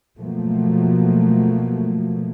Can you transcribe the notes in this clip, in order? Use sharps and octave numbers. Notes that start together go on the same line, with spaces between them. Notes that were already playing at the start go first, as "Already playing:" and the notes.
B2 F3 F#3 A3 A#3